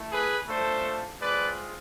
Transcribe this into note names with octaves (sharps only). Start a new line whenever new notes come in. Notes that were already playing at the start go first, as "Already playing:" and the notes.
Already playing: A3 E4
G#4 B4
A3 D4 F4 A4 C5
G#3 C4 F4 B4 D5